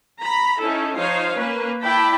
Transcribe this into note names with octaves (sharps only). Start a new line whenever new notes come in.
A#5 B5
C#4 D#4 E4 A4
F3 D#4 C5 C#5 F5
A#3 C#4 B4
E4 D5 G5 A5 B5